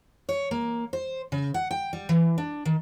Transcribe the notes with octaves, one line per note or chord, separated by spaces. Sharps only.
C#5
A#3
C5
C#3
F#5
G5
G3
E3
D4
D#3